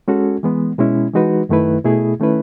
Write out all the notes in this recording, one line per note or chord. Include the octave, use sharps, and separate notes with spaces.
G#3 C#4 F#4 A4
E3 G#3 B3
B2 G#3 C#4 E4
E3 G#3 D#4 F#4 B4
F#2 D#3 A3 E4 B4
B2 A3 E4 G#4
D#3 A3 C#4 E4 B4